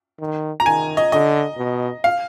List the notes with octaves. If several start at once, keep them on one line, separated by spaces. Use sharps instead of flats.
D#3
A#5
D#3 G#5
D#5
D3 D#5
B2
F5